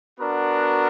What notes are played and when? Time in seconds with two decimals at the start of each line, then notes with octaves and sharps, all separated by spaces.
0.19 B3 D4 F#4 A#4